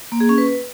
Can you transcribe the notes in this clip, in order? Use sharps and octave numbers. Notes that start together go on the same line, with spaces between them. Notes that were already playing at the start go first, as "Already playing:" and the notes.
A#3
G#4
C#4
B4